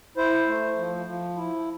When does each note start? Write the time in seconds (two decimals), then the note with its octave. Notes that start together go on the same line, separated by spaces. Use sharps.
0.17 E4 C5
0.48 A3
0.77 F3
1.06 F3
1.36 E4